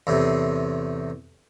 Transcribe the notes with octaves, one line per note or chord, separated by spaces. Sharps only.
E2 A2 C3